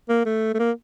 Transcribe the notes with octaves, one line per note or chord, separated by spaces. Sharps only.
A#3
A3
A3
A#3